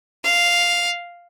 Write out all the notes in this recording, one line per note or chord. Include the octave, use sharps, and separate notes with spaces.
F5